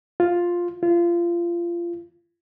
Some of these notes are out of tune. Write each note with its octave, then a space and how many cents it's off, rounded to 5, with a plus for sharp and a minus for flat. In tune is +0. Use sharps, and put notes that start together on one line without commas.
F4 +5
F4 -25